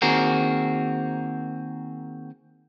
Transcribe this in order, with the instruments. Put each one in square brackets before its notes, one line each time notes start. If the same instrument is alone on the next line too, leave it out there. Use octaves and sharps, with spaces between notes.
[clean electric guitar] D#3 A#3 C4 F#4 G#4 A#4